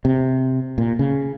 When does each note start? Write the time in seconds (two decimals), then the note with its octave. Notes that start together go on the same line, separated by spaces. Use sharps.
0.05 C3
0.78 A#2
0.99 C#3